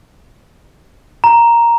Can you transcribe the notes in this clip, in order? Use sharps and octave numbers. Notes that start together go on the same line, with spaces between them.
A#5